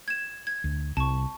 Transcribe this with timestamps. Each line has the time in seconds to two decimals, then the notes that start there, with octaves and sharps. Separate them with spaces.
0.08 G#6 E7
0.47 G#6
0.64 D2
0.97 C2 A5 C#6